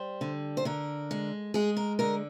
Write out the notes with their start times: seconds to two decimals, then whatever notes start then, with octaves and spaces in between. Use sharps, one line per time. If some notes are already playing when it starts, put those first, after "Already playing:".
Already playing: G3 C5
0.21 D3
0.57 C5
0.65 D3 A#4
1.11 G#3
1.54 G#3 G#4
1.77 A#4
1.99 D3 A#4